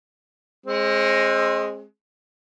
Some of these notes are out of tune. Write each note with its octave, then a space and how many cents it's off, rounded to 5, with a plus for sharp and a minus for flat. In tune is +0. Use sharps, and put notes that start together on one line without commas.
G#3 +0 C4 +30